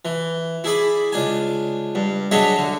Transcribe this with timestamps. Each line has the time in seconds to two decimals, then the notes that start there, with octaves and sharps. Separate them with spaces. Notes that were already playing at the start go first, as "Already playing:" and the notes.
0.05 E3
0.64 E4 G#4 D5 B5
1.12 C#2 D4 G#5
1.95 G2
2.31 F#3 D4 G#4 C#5 D#5 E5
2.58 D3